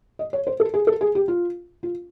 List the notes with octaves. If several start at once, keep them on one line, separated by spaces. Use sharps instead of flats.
D#5
C#5
C5
A4
G#4
A4
G#4
G4
F4
F4